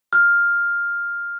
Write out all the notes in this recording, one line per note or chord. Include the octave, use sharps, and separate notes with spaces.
F6